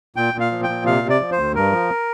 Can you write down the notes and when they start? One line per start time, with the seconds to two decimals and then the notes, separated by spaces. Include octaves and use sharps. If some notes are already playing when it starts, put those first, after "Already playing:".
0.16 A#2 G5
0.34 A#2
0.40 F5
0.51 F3
0.63 G5
0.69 A#2
0.85 C3 F5
1.03 C3
1.10 D5
1.20 F3
1.32 C5
1.38 D2
1.55 G2 A#4
1.72 F3